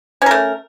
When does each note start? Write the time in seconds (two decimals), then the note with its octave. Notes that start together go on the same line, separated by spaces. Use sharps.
0.22 C#4
0.26 A#4
0.31 A3